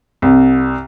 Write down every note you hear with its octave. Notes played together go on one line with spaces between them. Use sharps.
C2